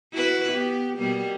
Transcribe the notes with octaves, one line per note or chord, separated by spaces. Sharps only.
E4 F#4 B4
B3 G4
B2 G3 A#3